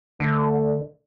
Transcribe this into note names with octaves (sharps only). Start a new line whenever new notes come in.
D3 A3